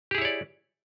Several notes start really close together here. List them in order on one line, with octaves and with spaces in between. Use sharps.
G4 G#4 E4 C#5 D5